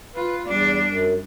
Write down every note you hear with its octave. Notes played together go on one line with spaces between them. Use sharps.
F4 B4
E2 G3 D4 D5
F#2